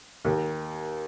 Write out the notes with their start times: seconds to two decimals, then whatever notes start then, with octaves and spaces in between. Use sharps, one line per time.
0.25 D#2